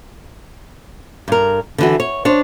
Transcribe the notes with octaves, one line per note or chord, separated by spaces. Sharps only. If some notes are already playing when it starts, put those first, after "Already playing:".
G2 A#4
D3 E3 F#4
C#5
D4 C5 C#5